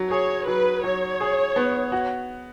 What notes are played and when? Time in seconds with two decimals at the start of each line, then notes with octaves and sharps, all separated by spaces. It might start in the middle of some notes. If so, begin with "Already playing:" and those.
Already playing: F#3
0.11 G#4 C#5
0.47 F#3 B4
0.84 F#3 C#5
1.21 G#4
1.56 B3
1.92 F#4